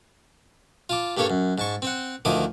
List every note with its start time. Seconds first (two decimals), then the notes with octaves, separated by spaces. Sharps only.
0.89 F4 A5 D6
1.17 G2 G3 A#3 A4 C#5
1.30 F#2
1.58 G#2 A5 C#6
1.82 C4 C5 F#5
2.25 D2 D#3 F3 E4 D6 D#6